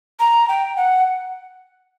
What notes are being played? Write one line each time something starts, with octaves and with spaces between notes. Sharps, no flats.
A#5
G5
F#5